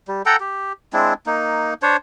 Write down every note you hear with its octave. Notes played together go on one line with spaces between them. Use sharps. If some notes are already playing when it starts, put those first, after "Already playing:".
G3
A4 F#5 G5 A#5
G4
G#3 C4 D4 E4
A#3 D#4
D4 C5 C#5